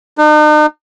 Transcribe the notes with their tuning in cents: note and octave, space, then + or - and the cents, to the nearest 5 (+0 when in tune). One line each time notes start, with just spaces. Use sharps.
D#4 -45